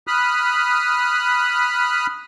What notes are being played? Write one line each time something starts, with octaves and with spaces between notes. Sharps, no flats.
B5 D#6 F6 F#6